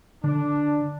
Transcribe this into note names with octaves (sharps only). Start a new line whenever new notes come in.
D3 D4